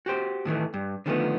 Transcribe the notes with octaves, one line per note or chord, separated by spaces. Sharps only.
F#4 G4 C5
A2 D#3 E3 A3
G2
D3 D#3 F3 G#3 A3 B3